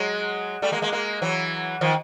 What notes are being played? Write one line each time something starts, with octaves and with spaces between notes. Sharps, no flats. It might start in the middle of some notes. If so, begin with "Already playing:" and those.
Already playing: F#3 G#3
G3 A3
G#3 A#3
G#3 A#3
G#3 A#3
E3 F#3
D#3 F3